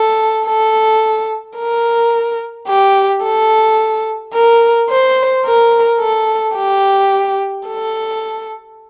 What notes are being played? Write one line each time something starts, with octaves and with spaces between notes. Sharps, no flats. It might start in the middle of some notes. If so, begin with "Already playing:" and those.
Already playing: A4
A4
A#4
G4
A4
A#4
C5
A#4
A4
G4
A4